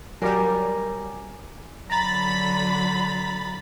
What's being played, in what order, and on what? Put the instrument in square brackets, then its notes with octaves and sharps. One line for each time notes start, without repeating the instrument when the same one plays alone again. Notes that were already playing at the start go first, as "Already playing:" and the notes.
[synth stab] F#3 G3 [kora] A#4 [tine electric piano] G#5 D6
[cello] D3 F#3 [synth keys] A#5 A6 [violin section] B5